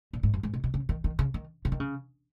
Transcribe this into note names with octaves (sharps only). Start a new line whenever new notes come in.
A#2
G#2
F#2
G#2
B2
B2
C#3
D#3
D#3
C#3
D#3
C#3
D#3
C#3